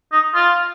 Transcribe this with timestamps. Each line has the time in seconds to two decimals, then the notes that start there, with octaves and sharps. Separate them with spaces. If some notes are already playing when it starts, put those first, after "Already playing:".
0.12 D#4
0.35 F4